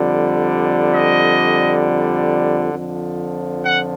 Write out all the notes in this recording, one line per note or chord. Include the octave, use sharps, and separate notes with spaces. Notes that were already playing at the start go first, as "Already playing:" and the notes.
Already playing: F2 D3 G3
D#5
F2 D3 F3
F#5